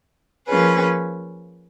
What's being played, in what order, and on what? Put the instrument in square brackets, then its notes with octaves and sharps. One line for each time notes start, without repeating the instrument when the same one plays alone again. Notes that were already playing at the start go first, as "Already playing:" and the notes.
[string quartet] F3 A#3 C#4 G#4 B4